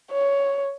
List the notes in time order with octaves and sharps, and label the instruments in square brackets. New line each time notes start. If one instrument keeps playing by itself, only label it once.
[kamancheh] C#5